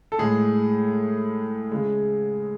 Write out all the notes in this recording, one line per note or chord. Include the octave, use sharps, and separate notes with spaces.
A4
A2 G#3 G#4
C#3 G#3